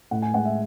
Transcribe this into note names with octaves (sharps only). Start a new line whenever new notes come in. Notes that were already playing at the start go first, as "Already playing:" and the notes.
A2 F#5
G#5
G#3 F#5
E5